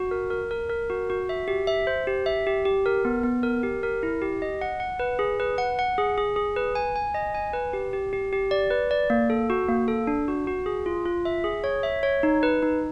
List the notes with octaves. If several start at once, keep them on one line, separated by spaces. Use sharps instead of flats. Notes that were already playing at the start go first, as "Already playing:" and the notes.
Already playing: F#4
A#4
A#4
A#4
A#4
F#4
F#4
E5
G4
E5
C5
G4
E5
G4
G4
A#4
B3
B3
A#4
G4
A#4
E4
G4
D#5
F#5
F#5
B4
G#4
B4
F#5
F#5
G#4
G#4
G#4
B4
G#5
G#5
D#5
G#5
B4
G4
G4
G4
G4
D5
B4
D5
A#3
A4
F#4
A#3
A4
D4
F#4
F#4
G#4
F4
F4
E5
G#4
C#5
E5
C#5
D#4
B4
D#4